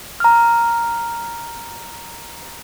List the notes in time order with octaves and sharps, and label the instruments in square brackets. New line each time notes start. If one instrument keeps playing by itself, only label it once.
[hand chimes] A#5 F6